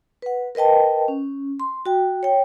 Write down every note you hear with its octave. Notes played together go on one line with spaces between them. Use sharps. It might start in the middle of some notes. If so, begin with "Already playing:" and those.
B4 F#5
A#4 B4 D#5 G5 A5
C#4
C6
F#4 G5
C#5 G5